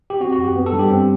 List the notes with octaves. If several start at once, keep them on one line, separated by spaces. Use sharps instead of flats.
G4
C4 F#4
F#4
F#2
G4
B3
A4
G2
G4
C4